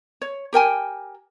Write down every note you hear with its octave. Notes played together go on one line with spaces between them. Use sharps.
C#5
G4 A#4 G5 G#5